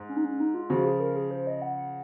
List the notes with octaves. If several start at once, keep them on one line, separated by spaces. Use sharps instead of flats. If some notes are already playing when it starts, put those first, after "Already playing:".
Already playing: G#2
C#4
D#4
C#4
D#4
F4
C#3 F3 F#4
G#4
A#4
G#4
C5
D#5
F#5
F#5